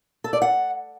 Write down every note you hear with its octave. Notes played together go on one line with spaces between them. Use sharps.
A4
D5
F#5